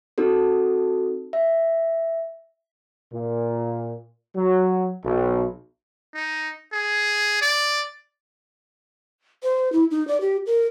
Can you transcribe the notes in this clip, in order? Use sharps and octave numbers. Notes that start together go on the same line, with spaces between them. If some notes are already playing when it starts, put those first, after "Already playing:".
C4 D#4 F#4 A4
E5
A#2
F#3
B1
D#4
G#4
D5
C5
E4
D#4
D5
G4
A#4